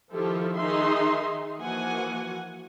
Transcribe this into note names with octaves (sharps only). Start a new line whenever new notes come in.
D#3 F3 E4 F4 G4 A4
D#3 D#4 G#4 E5 C6
E3 F3 A#3 F#4 F#5 G#5